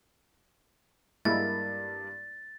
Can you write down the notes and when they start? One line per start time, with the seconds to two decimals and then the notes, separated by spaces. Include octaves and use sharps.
1.25 G2 G#3 A#3 E4 A#4 A6